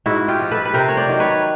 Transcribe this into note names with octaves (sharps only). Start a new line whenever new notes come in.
G#2 E4 F#4
F4 G4
F3
A4 B4
B4
C3 A#4 C5
C#5
C5 D5
D#3 F#3
B4 C#5